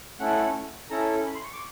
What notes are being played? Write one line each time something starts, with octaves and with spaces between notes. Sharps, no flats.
A3 C#4 E4 A4 F#5
C#4 E4 A4 A#5
B5
C6
C#6
D6